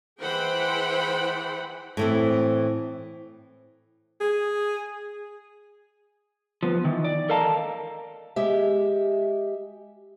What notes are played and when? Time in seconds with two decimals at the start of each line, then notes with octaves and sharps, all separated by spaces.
0.20 E3 G#4 C5 F#5 G5 B5
1.97 A2 E3 C4
4.21 G#4
6.63 F3 B3
6.85 D#3 E3
7.04 D5
7.29 A4 A#4 D#5 F5 A5 A#5
8.36 G#3 G4 E5